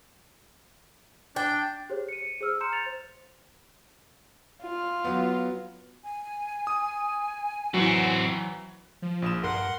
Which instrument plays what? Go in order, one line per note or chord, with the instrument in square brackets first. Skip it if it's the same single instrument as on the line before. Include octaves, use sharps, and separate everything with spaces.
[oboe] D4 [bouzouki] G5
[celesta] G4 G#4 C5 C#5
C#7 D#7
G#4 C5 E6 F6
A#5 C6 G6 C#7 E7
A6 F7
C5
[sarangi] F4
[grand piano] F#3 B3
[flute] G#5
[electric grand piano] D#6
[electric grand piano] E3 F#3 [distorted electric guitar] C4 F#4
[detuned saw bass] F3
[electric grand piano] A#1 D#6 E7
[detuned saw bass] G2 [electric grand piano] A#4 [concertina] F#5 C6